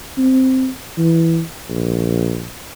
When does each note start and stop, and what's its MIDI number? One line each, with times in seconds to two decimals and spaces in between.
0.18 0.70 60
0.98 1.41 52
1.70 2.49 34